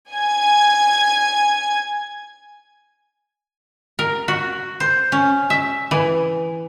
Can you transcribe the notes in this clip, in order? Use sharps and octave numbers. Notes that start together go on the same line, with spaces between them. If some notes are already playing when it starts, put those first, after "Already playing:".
G#5 G#6
A#4
F#4
C5
C#4
E5
E3